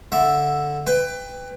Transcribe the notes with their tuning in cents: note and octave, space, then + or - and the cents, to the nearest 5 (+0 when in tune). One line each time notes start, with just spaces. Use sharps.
D3 +0 E5 +0
B4 +20 G5 +20